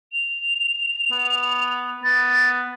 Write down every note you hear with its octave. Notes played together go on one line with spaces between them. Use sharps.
F7
B3
B3 A6